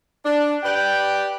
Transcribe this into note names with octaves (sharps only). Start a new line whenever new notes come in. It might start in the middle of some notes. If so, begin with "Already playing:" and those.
D4
G4 B4 D5 G5